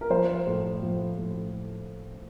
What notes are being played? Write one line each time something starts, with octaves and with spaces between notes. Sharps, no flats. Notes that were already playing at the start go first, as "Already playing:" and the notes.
A#4
F3 C5
A2
F3
A2